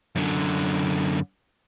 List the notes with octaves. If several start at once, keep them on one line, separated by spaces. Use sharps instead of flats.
F#2 D3